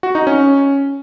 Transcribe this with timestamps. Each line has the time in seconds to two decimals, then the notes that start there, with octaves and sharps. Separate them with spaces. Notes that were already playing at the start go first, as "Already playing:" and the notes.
0.03 F#4
0.15 D#4
0.27 C#4